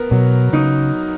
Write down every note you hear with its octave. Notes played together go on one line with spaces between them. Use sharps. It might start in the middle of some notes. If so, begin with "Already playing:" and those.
Already playing: B3 A#4
B2 F#3
C#3 D#4